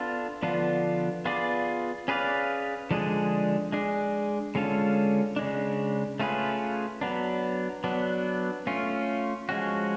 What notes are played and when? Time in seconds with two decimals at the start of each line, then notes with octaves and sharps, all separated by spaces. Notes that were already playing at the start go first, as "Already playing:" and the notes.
Already playing: B3 D4 F4 A4
0.42 D3 F3 B3 D4 F4
1.25 B3 F4 G#4 D5
2.08 C#4 G#4 B4 D5 F5
2.91 D3 F3 G#3 D4 G#4
3.72 G#3 D4 G#4
4.55 D3 G#3 C#4 F4 A4
5.36 C#3 G#3 D4
6.20 A3 C#4 F4 G#4 B4
7.01 F#3 B3 D4
7.84 F#3 B3 D4
8.67 A3 C#4 F4
9.49 F3 G#3 C#4 F#4